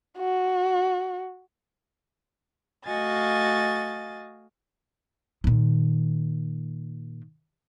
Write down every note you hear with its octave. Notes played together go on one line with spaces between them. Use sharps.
F#4
A3 F#4 D#5 F5 G#5 A6
A#2 D#3